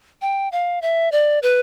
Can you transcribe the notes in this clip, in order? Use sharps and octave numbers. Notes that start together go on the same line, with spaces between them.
G5
F5
E5
D5
B4